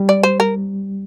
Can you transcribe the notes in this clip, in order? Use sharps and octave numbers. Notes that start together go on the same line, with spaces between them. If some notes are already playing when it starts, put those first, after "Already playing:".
Already playing: G3
D5
C5
A#4